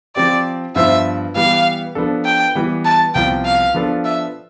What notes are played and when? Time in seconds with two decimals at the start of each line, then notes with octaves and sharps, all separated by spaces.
0.16 F3 C4 G4 D5
0.76 G2 F3 B3 F4 C5 E5
1.36 E3 G3 B3 F5
1.95 F3 B3 D4 A4
2.25 G5
2.55 E3 G3 B3
2.85 A5
3.14 C2 C3 F3 B3 F4 G5
3.45 F5
3.74 F3 B3 D4 F4 A4
4.05 E5